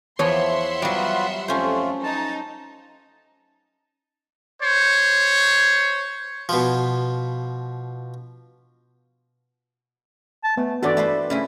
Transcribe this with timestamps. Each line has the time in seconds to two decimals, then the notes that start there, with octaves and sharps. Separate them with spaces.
0.19 E2 F3 C#5 E5 F#5 C6 C#7
0.82 F#3 G3 B3 F4 F#4
1.48 F2 A3 C#4 F4 C5
2.03 D#4 A5
4.61 C5 C#5
6.49 B2 F3
10.44 A5
10.57 A3 B3
10.83 G2 E3 D4 F#4 A4 D5
10.97 A3 B4 C5
11.30 C#3 A3 E4 G#4